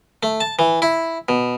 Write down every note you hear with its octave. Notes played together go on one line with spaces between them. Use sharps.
A3
A5
E3
E4
B2